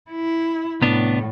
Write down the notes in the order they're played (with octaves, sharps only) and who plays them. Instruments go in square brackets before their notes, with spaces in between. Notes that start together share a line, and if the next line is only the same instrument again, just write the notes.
[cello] E4
[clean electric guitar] C2 B3 D4 [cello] A2